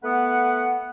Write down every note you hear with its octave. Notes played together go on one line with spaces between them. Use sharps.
A3 B3 B4 F#5